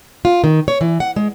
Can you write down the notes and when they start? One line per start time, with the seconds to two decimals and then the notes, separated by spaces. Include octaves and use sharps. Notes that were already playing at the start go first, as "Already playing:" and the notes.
0.25 F4
0.44 D#3
0.68 C#5
0.81 E3
1.00 F#5
1.16 G#3